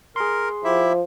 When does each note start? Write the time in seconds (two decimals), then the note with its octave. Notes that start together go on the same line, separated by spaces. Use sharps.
0.16 G#4 A#4 C6
0.64 F3 E4 G4 E5